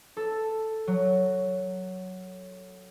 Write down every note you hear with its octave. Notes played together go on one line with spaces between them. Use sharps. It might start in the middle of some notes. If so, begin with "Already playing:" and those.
A4
F#3